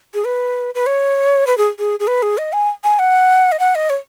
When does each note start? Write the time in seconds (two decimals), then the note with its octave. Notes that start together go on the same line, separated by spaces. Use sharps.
0.14 G#4
0.25 B4
0.75 B4
0.86 C#5
1.47 B4
1.57 G#4
1.79 G#4
2.00 G#4
2.07 B4
2.22 G#4
2.38 D#5
2.53 G#5
2.84 G#5
2.99 F#5
3.52 D#5
3.59 F#5
3.75 D#5
3.90 C#5